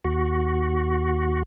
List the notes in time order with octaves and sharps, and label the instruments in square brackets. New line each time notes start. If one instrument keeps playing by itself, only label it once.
[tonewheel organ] D#2 F#4